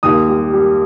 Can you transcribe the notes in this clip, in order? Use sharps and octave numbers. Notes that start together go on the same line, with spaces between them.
D#2 D#6
G3
G3